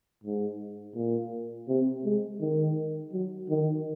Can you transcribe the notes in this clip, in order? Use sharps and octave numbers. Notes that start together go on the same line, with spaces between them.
G#2
A#2
C3
G#3
D#3
F#3
D#3